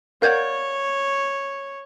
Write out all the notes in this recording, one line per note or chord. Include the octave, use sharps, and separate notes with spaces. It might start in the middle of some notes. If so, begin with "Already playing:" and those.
A#4 C#5 D5 F5 F#5 G6 G#6